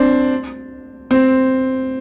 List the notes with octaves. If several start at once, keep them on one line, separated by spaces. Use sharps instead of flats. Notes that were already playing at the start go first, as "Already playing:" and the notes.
Already playing: C4 D4
C4